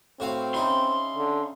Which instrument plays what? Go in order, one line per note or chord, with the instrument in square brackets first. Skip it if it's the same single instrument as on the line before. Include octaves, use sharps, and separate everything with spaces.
[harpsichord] A2 F#4 F5 [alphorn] C4
[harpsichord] C#3 D#4 E4 [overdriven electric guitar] C6
[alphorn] D3